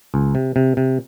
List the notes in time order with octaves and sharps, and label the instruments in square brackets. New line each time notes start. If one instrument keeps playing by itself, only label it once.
[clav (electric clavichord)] C#2
C3
C3
C3